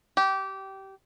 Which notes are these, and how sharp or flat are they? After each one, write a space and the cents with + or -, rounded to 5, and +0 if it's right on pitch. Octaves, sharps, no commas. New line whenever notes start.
G4 -20